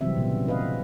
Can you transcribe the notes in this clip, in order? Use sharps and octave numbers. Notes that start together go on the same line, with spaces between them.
C3 E3 F#3 G3 C4 E5
A#2 C#3 B3
D#4 B4 D#5 F5